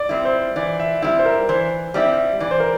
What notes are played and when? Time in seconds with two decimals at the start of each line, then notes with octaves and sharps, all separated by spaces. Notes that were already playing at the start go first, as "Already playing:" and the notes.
Already playing: D5
0.09 G3 C4 E4
0.25 C5
0.56 E3 D5
0.80 E5
1.02 G3 C4 E4
1.19 C5
1.26 A#4
1.49 E3 C5
1.94 G3 C4 E4 D5
2.40 E3 D5
2.51 C5
2.60 A#4